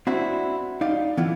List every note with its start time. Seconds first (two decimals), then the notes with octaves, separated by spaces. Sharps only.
0.07 C4 D4 E4 F#4
0.81 D#4 D5 F5
1.17 E3 B3 E4 F4